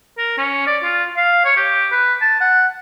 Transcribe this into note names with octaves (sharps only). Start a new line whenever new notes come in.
A#4
C#4
D5
F4
F5
C#5
G4
B4
A5
F#5